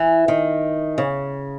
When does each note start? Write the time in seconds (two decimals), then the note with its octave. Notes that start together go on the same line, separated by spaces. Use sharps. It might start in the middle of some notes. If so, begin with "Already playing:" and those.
Already playing: E3
0.28 D#3
0.98 C#3